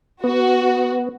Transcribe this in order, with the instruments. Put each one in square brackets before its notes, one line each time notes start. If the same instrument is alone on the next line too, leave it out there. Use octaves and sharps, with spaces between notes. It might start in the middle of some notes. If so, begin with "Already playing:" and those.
[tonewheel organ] B3 [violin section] F#4